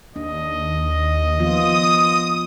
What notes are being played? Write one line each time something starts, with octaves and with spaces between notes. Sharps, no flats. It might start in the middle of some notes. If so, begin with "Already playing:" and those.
D#2 D4 D#5
F3 B3 F4 D#6